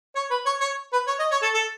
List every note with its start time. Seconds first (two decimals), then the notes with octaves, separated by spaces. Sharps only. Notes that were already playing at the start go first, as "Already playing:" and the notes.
0.15 C#5
0.30 B4
0.46 C#5
0.61 C#5
0.93 B4
1.07 C#5
1.19 D#5
1.31 C#5
1.42 A4
1.54 A4